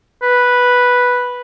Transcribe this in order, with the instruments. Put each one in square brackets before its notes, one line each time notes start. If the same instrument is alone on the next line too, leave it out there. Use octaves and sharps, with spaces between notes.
[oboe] B4